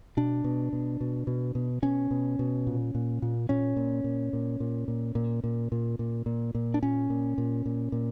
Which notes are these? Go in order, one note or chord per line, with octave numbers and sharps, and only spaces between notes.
B2 D4
B2
B2
B2
B2
B2
B2 C#4
B2
B2
A#2
A#2
A#2
A#2 C#4
A#2
A#2
A#2
A#2
A#2
A#2
A#2
A#2
A#2
A#2
A#2
D4
A#2 C#4
A#2
A#2
A#2
A#2